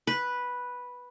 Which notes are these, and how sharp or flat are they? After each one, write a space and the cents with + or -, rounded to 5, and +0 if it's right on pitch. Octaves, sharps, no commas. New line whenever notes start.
B4 -5